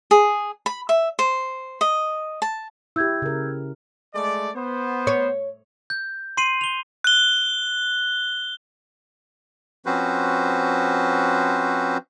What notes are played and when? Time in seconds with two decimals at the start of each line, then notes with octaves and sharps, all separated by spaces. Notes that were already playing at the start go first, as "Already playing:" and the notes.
0.11 G#4
0.66 B5
0.89 E5
1.19 C5
1.81 D#5
2.42 A5
2.96 E4 G4 E6 G6 G#6
3.22 C#3 A#4
4.14 G#3 A3 D5
4.55 B3 C5
5.07 C#5
5.90 G6
6.37 C6 C7 D#7 F#7
6.61 F7 G7
7.04 F#6 G7
9.86 F3 C4 C#4 F#4 B4 C5